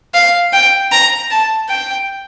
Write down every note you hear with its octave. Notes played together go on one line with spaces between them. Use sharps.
F5
G5
A#5
A5
G5